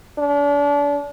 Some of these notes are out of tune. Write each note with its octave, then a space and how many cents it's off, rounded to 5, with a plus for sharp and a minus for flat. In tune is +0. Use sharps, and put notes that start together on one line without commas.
D4 -35